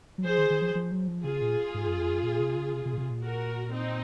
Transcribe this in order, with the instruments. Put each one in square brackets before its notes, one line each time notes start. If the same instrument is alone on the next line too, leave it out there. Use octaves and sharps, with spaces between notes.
[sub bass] F#3
[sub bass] F3 [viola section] G#4 C5
[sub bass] D#3
D#3
F3
F3
F#3
F3
[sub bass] C#3 [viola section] F4 G#4
[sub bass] A#2
G#2
F#2
F2
F#2
A#2
C3
C#3
C3
C3
A#2
C3
A#2
[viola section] F#4 A#4
C4 D#4